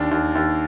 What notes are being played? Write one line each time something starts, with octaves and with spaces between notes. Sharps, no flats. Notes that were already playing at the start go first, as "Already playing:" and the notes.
Already playing: D#2 D4
D#2
D#2